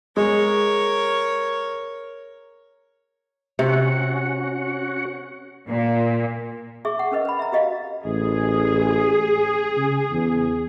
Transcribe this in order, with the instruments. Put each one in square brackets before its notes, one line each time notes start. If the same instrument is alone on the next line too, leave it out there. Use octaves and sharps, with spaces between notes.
[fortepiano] G#3 [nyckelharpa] A#4 C#5
[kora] C3 [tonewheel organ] C#4 F#4 F#5
[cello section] A#2
[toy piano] G#4 E5 C#6 D6
F#5
C#4 A#4 B4 D#5
B4 B5
E5 A#5
F#4 G4 D#5 F5
[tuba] A1 [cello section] G#4
[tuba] C#3
E2